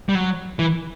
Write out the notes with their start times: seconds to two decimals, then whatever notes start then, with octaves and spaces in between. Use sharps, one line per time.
0.09 G3
0.15 F#3
0.59 E3